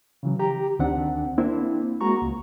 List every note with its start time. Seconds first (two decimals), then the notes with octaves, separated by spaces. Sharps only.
0.23 C#3 E3 F#3
0.39 G4 A#5
0.79 D2 D#3 C4 D4 F#5
1.38 A#3 C4 D4 E4
2.01 G#3 A#3 F#4 A#5 C#6
2.22 C#2